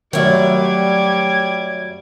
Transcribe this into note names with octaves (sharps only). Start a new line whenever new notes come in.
F#2 D#3 F#3 G3 A3 D5 D6 G#6